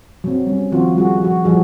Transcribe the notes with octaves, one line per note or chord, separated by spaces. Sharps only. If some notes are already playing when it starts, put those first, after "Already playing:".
F#3 C4
G3 C#4
D#3 F3 F#3 C4 F4 F#4
G3 F4 F#4 G#4
F3 F#4
E3 F3 G3 F#4 G#4 A4